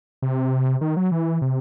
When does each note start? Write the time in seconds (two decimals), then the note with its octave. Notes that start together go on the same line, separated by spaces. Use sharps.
0.22 C3
0.81 D#3
0.97 F#3
1.12 E3
1.42 C3